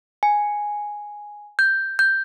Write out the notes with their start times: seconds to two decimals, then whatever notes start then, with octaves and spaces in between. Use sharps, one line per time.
0.23 G#5
1.59 G6
1.99 G6